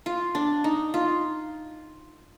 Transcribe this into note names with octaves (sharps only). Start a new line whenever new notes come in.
F4
D4
D#4
F4